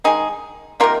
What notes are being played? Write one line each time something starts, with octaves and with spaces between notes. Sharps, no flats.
D#3 G#3 D#4 G#4
C3 D#3 A#3 F4 A#4